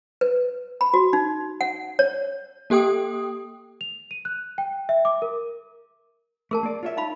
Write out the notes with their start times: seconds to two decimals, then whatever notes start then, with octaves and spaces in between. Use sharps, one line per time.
0.21 B4
0.81 B5
0.94 F#4
1.13 D#4
1.61 F#5
1.99 C#5
2.70 A#3 G4 A4 G5 D#6
3.81 F7
4.11 D#7
4.25 F#6
4.58 G5
4.89 E5
5.05 D6
5.22 A#4
6.51 A3 G#4 A#4 A5
6.63 A#3 D5
6.83 F4 C#5 E5
6.97 D#4 F5 B5